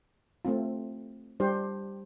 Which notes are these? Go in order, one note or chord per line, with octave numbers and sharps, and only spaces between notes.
A3 C4 F4
G3 D4 G4 C5